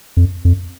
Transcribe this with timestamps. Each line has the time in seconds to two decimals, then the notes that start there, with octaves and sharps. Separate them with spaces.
0.17 F2
0.45 F2